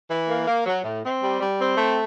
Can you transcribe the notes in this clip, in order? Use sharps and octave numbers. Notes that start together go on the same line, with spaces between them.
E3
A#3
A#3
F#3
A2
C4
G3
G3
C4
A3